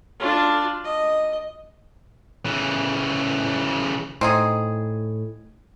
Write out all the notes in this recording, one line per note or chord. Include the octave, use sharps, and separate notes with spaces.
D4 F4
D#5
C#3 E3
A2 C4 D#4 G#4